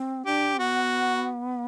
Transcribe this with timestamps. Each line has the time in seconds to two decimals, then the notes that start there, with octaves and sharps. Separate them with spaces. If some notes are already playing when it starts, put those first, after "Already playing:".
Already playing: C4
0.26 D4 G4
0.59 B3 F#4